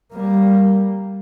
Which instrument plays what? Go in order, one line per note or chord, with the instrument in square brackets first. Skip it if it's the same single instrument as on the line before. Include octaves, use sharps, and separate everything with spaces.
[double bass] G3 A#3